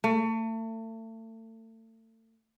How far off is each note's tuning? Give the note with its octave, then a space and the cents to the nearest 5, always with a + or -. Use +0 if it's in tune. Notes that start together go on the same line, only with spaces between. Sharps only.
A3 +35